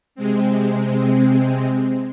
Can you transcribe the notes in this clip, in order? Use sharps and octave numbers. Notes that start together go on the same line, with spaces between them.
C3 G#3 C4